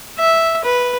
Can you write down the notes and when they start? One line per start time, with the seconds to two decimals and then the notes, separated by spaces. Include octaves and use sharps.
0.19 E5
0.65 B4